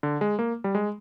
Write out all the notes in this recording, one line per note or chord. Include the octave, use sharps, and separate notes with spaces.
D3
G#3
A#3
G3
G#3